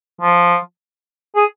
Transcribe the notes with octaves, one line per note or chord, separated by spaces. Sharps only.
F3
G#4